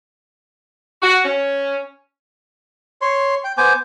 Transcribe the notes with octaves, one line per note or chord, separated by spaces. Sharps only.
F#4
C#4
C#5 C6
G5
B3 C5 G#5 D6